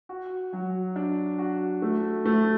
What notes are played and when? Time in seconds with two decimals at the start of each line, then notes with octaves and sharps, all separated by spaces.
0.09 F#4
0.53 F#3
0.96 D4
1.39 F#4
1.82 A3
2.26 A3